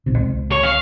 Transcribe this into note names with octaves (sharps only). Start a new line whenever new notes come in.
D1 B1 C3
C#2 C4
C#5
F5